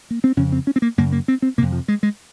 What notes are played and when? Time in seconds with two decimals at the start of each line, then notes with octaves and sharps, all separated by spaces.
0.10 A#3
0.24 C4
0.37 F2 C#3 C#4
0.52 C4
0.67 C#4
0.76 C4
0.82 A#3
0.98 F#2 C#3 A#3
1.12 A#3
1.28 C4
1.42 C4
1.58 C3 A#3
1.62 F2
1.72 F3
1.88 G#3
2.03 G#3